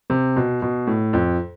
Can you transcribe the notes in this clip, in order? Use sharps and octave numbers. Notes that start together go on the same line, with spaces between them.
C3
B2
B2
A2
F2